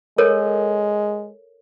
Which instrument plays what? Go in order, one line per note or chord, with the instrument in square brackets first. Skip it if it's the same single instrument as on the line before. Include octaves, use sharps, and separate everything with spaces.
[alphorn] G#3 [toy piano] A4 A#4 C#5